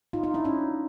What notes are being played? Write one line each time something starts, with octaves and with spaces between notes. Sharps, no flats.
D#4 F4
D#4 F4
D4 E4
C#4 D#4